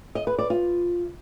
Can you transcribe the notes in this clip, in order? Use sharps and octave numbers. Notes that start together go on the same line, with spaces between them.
D#5
B4
D5
F4